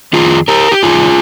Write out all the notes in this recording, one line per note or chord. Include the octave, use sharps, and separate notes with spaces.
F2 D#3 F4 G#4
G4 A#4
G4
G2 D#3 F4 G#4